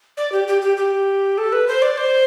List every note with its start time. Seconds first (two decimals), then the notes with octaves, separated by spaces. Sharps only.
0.17 D5
0.32 G4
0.48 G4
0.62 G4
0.77 G4
1.38 A4
1.52 B4
1.68 C5
1.82 D5
1.98 C5